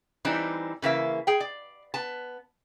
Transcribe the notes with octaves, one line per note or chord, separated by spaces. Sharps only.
E3 G3 C4 D4 D#4
C#3 E3 A#3 E5
G#4 G5
D5
B3 A5